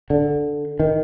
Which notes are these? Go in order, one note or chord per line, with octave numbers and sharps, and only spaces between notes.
D3
D#3